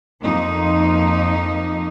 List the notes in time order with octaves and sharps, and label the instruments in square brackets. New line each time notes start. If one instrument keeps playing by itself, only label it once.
[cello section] F2 A#3 D#4